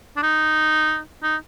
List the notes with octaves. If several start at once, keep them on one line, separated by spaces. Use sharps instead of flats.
D4
D#4
D#4